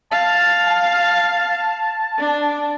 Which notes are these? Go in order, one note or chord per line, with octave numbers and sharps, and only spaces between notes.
F5 A5
A5
D4